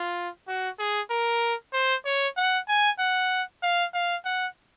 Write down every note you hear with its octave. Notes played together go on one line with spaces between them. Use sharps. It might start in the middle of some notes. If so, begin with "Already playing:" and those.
Already playing: F4
F#4
G#4
A#4
C5
C#5
F#5
G#5
F#5
F5
F5
F#5